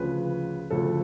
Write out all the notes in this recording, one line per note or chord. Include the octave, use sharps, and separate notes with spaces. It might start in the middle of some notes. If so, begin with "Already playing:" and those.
Already playing: D2 C#3 F3 B4
D2 C#3 F3 A4